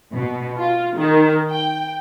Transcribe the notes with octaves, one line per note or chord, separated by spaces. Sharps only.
B2
F4
D#3
G5